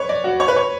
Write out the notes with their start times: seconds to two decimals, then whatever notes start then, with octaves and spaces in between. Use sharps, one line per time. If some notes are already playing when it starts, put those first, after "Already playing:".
Already playing: B4 C#5
0.09 D5
0.24 F#4
0.40 C#5
0.48 B4
0.56 C#5